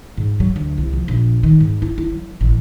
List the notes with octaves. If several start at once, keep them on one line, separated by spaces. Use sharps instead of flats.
G#2
F#3
D2
C2
F3
A#1
D#3
G#2
E4
E4
F#3
A1